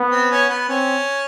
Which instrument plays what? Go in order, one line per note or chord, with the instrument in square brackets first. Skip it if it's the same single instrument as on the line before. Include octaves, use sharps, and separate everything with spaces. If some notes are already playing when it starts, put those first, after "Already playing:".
Already playing: [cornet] B3
[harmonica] C4
C#4
B3
[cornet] C4 [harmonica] C#4